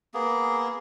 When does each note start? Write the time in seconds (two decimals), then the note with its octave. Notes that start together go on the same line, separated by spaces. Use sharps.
0.14 A#3 B3 G#4